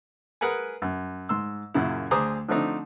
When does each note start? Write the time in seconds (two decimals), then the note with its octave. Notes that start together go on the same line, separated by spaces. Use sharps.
0.41 G#4 A#4 B4 F#5 G#5
0.82 F#2
1.29 G#2 C6 E6
1.74 F#2 A#2 C#3 E4
2.11 D2 G#4 C5 A#5 D6 D#6
2.49 D3 F3 A3 C4 D4 D#4